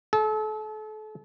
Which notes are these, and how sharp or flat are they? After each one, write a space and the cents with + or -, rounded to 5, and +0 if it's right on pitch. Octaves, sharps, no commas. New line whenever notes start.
A4 -35